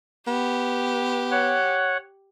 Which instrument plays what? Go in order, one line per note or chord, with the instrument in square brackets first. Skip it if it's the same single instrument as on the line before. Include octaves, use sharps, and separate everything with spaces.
[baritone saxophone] B3 [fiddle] G4
[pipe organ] C#5 F#5